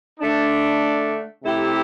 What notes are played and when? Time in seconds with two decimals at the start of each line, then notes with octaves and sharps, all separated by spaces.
0.20 D3 A3 D4
1.43 C3 A3 E4 G4